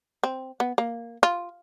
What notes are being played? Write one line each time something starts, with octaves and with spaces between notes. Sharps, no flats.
C4
B3
A#3
F4